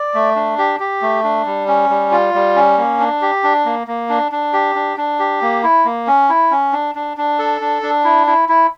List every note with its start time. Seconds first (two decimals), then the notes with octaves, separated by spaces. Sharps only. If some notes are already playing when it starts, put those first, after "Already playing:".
Already playing: D5
0.14 A3
0.36 D4
0.58 G4
0.80 G4
1.02 A3
1.24 D4
1.46 G3
1.68 C#4
1.90 G3
2.11 F4
2.34 G3
2.56 C#4
2.78 A#3
3.00 D4
3.22 G4
3.44 D4
3.65 A#3
3.87 A#3
4.09 D4
4.32 D4
4.53 G4
4.75 D4
4.97 D4
5.19 G4
5.42 A#3
5.63 E4
5.85 A#3
6.07 C#4
6.29 E4
6.51 C#4
6.73 D4
6.95 D4
7.17 D4
7.39 A4
7.61 D4
7.82 D4
8.04 E4
8.27 E4
8.49 E4